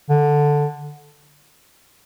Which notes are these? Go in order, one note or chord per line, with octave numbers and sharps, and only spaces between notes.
D3